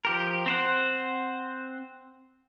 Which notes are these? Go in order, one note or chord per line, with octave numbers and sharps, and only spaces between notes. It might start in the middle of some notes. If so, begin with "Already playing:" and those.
F3 G4 A#4
C4 C5 F#5